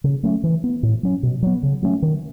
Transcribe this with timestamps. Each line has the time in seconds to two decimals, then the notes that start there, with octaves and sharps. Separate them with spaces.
0.04 C#3
0.23 F#3 A3 C#4
0.44 E3
0.64 B3
0.83 A2
1.03 F#3 C#4
1.23 B2
1.42 F#3 B3
1.63 C#3
1.83 F#3 A3 C#4
2.02 D#3